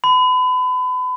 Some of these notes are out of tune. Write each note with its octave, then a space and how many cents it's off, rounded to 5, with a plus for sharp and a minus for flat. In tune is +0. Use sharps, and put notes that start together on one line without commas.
B5 +35